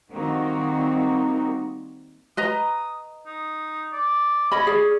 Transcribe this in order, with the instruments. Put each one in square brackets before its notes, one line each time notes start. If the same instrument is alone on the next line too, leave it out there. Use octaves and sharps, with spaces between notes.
[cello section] D#3 G3 A#3 C4 D#4 F#4
[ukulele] B4 D#5 A#5 [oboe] D#6
[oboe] D#4
D5
[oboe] C#4 [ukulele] D#5 B5
[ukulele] G#4 D5